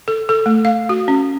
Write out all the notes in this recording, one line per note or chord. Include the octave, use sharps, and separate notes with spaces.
A4
A4
A3
F5
F#4
C#4